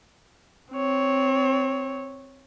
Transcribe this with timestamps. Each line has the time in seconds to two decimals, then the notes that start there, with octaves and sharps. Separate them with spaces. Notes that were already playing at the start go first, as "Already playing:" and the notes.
0.73 C4 C#5